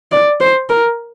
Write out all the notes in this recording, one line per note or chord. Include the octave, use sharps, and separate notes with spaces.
D5
C5
A#4